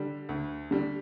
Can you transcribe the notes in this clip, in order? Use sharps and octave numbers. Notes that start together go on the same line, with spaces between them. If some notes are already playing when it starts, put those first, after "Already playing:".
Already playing: D3 G3
D2
D3 G3